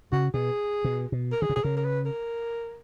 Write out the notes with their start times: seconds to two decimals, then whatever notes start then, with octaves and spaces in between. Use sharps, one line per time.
0.12 C#3 F#4
0.34 B2 G#4
0.85 B2
1.12 B2
1.32 A#4
1.42 D#3 G#4
1.50 C#3
1.56 B2 G#4
1.63 C#3 A#4
1.77 A#4
1.85 B4
2.06 A#4